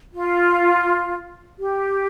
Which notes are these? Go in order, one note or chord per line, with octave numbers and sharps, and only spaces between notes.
F4
G4